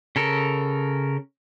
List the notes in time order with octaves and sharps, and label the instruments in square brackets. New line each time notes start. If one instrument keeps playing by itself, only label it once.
[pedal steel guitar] C#3 A4 A#4